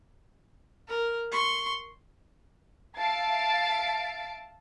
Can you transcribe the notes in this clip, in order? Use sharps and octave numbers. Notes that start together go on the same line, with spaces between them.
A#4
C6 C#6
E5 F5 A5 A6 C7 D7